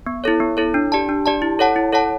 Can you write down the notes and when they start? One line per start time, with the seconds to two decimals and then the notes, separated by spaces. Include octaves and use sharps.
0.06 B3
0.24 E4 A4 C#5
0.40 B3
0.57 E4 A4 C#5
0.74 D4
0.92 G4 D5 A5
1.09 D4
1.26 G4 D5 A5
1.42 E4
1.59 A4 C#5 F#5 A5
1.76 E4
1.92 A4 C#5 F#5 A5